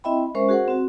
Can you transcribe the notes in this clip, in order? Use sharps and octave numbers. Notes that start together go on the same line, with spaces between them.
C4 E4 D#5 E5 G5 B5
G#3 C#4 A#4 C5 E5 C#6
F#4 G#4 A#4 C5 F#5
C4 F#4